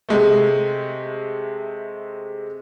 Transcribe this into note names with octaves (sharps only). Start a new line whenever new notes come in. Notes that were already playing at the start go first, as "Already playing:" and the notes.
C3 G#3 A3